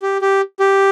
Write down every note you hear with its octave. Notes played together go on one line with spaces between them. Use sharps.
G4
G4
G4